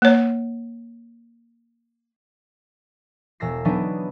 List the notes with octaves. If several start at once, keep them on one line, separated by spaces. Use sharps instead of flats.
A#3 C#5
E1 E6 A#6 C7
E3 F#3 B3 D4 D#4